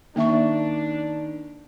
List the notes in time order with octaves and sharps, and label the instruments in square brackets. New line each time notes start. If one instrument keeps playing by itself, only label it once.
[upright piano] D#3 [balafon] A#3 E5 C#6 [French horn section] D4